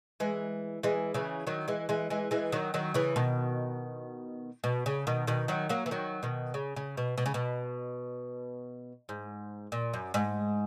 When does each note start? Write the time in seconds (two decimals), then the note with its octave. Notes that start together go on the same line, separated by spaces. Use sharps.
0.20 E3 G#3
0.83 E3 G#3
1.14 C#3 E3
1.47 D#3 F#3
1.68 E3 G#3
1.89 E3 G#3
2.10 E3 G#3
2.31 E3 G#3
2.52 D#3 F#3
2.74 D#3 F#3
2.94 C#3 E3
3.16 B2 D#3
4.64 B2
4.86 C#3
5.07 B2 D#3
5.27 B2 D#3
5.48 D#3 F#3
5.69 F#3 A#3
5.86 E3
5.91 D#3 F#3
6.23 B2 D#3
6.54 C#3
6.76 C#3
6.97 B2
7.18 B2
7.26 C#3
7.34 B2
9.09 G#2
9.72 A#2
9.94 F#2
10.14 G#2